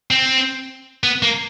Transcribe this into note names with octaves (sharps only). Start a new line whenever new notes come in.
C4
B3
A#3